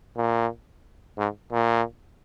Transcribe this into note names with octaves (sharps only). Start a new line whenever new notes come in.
A#2
G#2
A#2